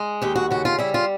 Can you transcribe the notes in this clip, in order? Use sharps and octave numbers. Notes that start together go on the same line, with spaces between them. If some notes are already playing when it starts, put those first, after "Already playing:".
Already playing: G#3
D#2 G4
F#4
C#3 F#4
F4
G3 E4
F4